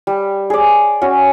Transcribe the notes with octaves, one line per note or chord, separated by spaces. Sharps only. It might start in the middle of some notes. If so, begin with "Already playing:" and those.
G3
G#4 D5
C#4 F#4